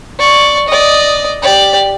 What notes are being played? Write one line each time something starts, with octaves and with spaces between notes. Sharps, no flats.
D5 C#6
D5 D#5
G4 D5